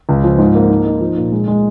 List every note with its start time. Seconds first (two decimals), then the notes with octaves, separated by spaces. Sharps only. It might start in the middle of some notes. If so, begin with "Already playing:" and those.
0.09 C#2
0.24 F3
0.38 G#2
0.55 A#3
0.70 D#4
0.85 D#4
1.00 F3
1.17 A#2
1.32 G#3
1.48 G#3